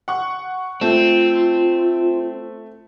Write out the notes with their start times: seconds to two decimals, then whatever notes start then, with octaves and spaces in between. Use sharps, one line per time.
0.08 F#5 C#6
0.81 A3 C4 F4